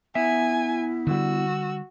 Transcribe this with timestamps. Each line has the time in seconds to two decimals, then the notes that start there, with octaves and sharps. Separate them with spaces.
0.15 B3 E4 E5 G#5
1.07 D3 G3 F#4 E6